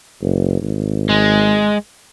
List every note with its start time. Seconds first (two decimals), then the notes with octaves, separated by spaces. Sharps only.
0.21 F#1
0.62 G#1
1.09 G#3